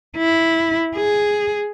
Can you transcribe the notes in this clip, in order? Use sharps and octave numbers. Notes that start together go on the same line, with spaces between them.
E4
G#4